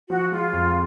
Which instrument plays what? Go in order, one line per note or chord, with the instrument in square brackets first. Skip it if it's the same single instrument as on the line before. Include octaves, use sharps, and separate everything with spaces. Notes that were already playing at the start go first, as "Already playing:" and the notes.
[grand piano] F3 [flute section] F#4
[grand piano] G#3 [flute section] F4
[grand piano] F2